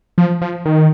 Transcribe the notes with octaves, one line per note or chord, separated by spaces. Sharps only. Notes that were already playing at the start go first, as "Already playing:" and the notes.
F3
F3
D#3